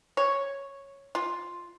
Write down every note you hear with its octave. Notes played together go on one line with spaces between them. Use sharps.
C#5
F4